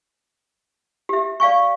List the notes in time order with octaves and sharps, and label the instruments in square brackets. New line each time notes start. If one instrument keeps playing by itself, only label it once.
[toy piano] G4 E5
D5 F5 G#5 C#6